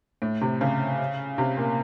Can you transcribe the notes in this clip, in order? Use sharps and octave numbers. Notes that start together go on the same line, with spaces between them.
A2
C3
C#3
C3
A#2